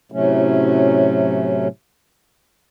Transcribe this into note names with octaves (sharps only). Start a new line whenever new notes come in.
A2 C3 F#3 A3 C#4